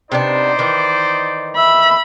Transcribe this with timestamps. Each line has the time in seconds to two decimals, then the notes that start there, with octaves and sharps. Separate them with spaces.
0.12 C3 B3 D4 D#4 C5 D5
0.59 D#3 E3
1.57 E5 B5